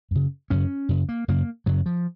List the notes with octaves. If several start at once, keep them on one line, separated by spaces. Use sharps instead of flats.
F#2 C#3
F#2 C#3 C#4
F#2 C#3
A#3
F#2 C#3 A#3
F#2 C#3 F#3
F3